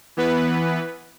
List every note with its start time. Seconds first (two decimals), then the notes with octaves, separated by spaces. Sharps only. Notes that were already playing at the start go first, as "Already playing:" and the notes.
0.17 E3 B3 B4